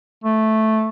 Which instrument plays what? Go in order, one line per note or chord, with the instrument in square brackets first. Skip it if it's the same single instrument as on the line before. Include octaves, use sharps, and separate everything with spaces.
[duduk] A3